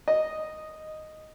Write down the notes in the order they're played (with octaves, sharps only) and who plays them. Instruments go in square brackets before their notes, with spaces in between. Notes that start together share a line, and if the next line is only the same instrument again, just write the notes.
[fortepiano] D#5